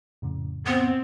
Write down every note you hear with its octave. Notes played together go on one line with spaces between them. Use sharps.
F2 A2 C#3
B3 C4 C5